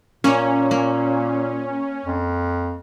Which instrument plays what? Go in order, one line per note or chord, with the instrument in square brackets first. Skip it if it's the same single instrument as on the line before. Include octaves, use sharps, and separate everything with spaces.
[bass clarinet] A#2 [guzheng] A#3 [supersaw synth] C#4
[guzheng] A#3
[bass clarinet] F2